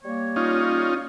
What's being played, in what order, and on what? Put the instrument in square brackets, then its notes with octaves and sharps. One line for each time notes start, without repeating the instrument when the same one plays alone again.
[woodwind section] G3 A#3 C#5
[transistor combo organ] C#4 D#4 F4